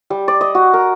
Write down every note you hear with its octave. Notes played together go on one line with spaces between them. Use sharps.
G3
D5
D#5
F#4
A#4